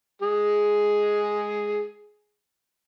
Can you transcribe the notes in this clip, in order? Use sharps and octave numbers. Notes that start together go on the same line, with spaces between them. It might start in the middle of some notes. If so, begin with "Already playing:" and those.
G#3 G#4